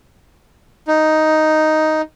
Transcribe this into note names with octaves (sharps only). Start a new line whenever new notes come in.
D#4